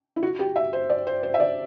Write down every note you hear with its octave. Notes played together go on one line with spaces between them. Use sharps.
E4
F#4
G4
E5
C5
D5
C5
C5
E5
D5